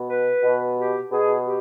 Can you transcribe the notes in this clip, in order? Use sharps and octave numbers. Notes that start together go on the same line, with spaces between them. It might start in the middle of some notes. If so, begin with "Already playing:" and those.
Already playing: B2
B4
B2
G4
B2 G#4
G4